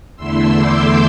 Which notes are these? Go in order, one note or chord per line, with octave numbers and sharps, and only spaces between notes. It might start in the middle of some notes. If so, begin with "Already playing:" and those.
E2 D3 A3 E4 C6 E6
D6 G6